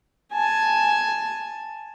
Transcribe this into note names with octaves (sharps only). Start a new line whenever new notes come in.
G#5 A5